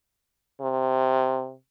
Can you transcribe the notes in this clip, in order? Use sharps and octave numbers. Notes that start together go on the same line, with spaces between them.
C3